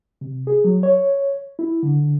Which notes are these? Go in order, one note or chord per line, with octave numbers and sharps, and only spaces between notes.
C3
G#4
F#3
C#5
E4
D3